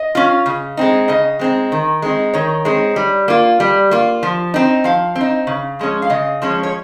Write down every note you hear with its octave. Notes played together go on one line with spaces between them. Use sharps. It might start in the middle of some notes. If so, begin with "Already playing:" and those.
Already playing: D#5
C#4 F4
C#3
G#3 C4 D#4
C#3 D#5
G#3 C4 D#4
D#3
G#3 C4 D#4
D#3 C#5
G#3 C4 D#4
G3
A#3 F4
G3
A#3 F4
F3
C4 D#4
F3 F5
C4
D#4
C#3
F3 G#3 C#4
F5
C#3 D#5
F3 G#3 C#4
C#5